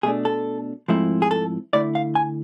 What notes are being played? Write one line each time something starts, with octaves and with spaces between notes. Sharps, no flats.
B2 A3 D4 G#4
A4
G#2 F3 A3 C4 E4
G#4
A4
D3 A3 E4 D5
F5
G#5